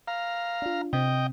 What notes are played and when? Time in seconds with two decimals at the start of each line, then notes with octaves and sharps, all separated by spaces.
0.08 F5 A#5
0.62 D4 F4
0.93 C3 C4 D#5 G5